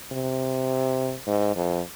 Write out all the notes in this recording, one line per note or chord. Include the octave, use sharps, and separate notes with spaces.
C3
G#2
F2